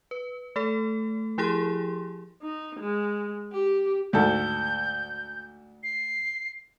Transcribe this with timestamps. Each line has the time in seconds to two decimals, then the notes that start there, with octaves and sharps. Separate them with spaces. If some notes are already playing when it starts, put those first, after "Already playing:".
0.11 B4
0.56 A3 A4
1.38 F3 E4 G4 G#4 C6
2.42 D#4
2.79 G#3
3.52 G4
4.13 D2 G#2 A4 G6
5.83 C7